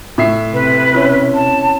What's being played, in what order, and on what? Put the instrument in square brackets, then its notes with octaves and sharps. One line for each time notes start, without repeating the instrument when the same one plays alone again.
[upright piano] A2 E5 C7
[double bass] C3 [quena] B4
[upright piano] C#4 E4
[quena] A5